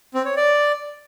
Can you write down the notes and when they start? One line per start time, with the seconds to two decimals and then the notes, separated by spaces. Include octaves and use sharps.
0.14 C4
0.25 C#5
0.37 D5